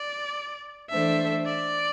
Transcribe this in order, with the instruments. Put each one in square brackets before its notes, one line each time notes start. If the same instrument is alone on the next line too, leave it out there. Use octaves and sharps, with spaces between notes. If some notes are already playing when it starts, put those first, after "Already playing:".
Already playing: [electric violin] D5
[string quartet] E3 A3 D4 A4 C5 [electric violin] E5
[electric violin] D5